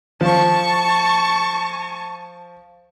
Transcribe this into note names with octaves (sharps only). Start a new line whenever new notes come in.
F3 A5 C#6